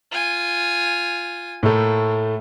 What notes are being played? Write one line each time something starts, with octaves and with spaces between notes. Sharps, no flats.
F4 G#5
A2 A3 A#3